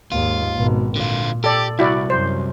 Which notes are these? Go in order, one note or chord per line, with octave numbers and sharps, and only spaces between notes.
D#2 G#2 F4
G#1 B2
A#2 D3 F4
G4 A4 D5
C2 E4 F#4 D5
F#2 C5